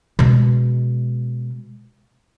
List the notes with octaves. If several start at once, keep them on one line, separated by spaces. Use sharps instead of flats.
B2 G#3